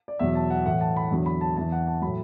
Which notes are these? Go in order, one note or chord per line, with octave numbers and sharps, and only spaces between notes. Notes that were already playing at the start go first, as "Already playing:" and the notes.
D5
E2 B2 F#3 E5
A5
F#5
A2 E3 F#5
A5
B5
E2 D3 F#3
B5
A5
E2 E3 A5
F#5
A5
A2 F#3 B5